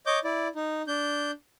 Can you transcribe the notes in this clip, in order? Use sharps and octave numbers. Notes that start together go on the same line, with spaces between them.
C#5 D#5 D6 G6
E4 D5
D#4
D4 G6